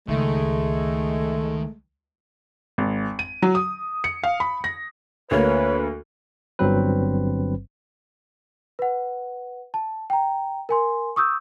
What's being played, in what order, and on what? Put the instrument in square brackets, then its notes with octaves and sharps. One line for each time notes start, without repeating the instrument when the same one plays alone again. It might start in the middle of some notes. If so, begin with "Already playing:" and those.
[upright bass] C#2 [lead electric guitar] D#3 [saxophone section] G#3 A3
[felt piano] G#1
D#7
F#3
D#6
C#7
F5
B5
A#6
[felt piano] D2 A#3 [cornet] B4 [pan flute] C#5
[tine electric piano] G1 G2 F#3 C4 B4
[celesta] B4 F#5
A5
G5 A#5
A#4 G#5 C6
C#6 D#6 E6 G6